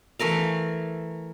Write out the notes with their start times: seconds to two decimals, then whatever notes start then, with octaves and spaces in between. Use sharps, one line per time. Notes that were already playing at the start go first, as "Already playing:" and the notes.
0.19 E3 A3 A#4 F5